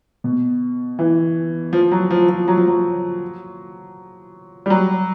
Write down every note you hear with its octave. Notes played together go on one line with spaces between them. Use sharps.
B2
E3
F3
F#3
F3
F3
F#3
F3
F#3
G3
F#3